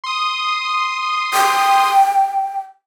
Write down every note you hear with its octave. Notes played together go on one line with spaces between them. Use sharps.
C6 D#6
G5